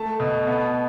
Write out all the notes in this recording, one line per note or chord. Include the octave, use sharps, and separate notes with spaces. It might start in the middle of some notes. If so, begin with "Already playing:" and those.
Already playing: A3 A5
B2
B3